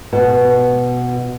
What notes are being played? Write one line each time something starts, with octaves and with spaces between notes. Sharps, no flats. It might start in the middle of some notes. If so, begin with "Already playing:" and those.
B2